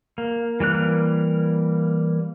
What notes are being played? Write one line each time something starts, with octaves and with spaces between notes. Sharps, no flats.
A#3
E3 G3 A#3 F#6